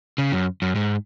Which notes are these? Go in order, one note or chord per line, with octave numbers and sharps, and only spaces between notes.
C#3
F#2
F#2
G#2